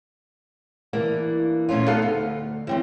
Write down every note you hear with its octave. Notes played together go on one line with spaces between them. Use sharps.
E3 A#3 D4
D2 A#2 A3 C#4 F4
A3 B3 D#4 A4 B4 F5
D2
E3 C4 C#4